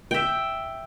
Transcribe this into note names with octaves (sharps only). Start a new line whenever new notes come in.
E5 G5